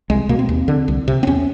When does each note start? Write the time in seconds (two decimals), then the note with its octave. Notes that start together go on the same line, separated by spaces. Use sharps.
0.10 C2 G#3
0.29 B2 A#3
0.39 C4
0.49 D#2
0.68 D3
0.88 C2
1.08 C3
1.23 C4
1.27 E2 C#4